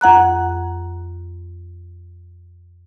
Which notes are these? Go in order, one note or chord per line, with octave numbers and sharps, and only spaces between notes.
F2 F#5 A#5 F#6